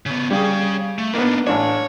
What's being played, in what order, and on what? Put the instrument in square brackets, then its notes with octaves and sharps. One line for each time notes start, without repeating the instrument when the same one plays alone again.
[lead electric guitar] C#3 B3
[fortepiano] G3 G#4 [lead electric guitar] C#4 F5
[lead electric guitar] A3
[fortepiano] A#3 B3 [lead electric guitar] D4 D#4
[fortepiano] A1 D4 [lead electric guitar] C#5